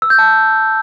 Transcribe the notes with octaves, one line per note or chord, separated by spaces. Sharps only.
E6
G6
A5